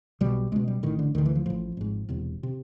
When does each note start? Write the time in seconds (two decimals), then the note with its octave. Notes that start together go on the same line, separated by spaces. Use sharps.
0.21 B1 B2 G3
0.52 C#2 B2 G#3
0.68 G3
0.83 A1 A2 D#3
0.99 D3
1.15 D2 D3 D#3
1.26 E3
1.35 F3
1.46 A1 A2 F3
1.77 G#1 G#2
2.09 E1 E2 C3
2.43 C3